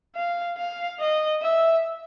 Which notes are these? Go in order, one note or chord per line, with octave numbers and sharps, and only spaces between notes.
F5
F5
D#5
E5